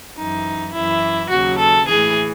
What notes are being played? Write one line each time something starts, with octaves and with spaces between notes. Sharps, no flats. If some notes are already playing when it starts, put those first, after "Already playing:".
F#2 E3 D#4
F#2 E3 E4
D#2 C#3 F#3 F#4
A4
A2 E3 G#4